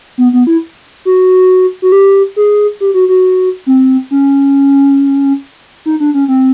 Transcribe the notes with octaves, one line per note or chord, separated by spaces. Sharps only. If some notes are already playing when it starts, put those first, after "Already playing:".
B3
B3
E4
F#4
F#4
G4
G#4
G4
F#4
F#4
C4
C#4
D#4
D4
C#4
C4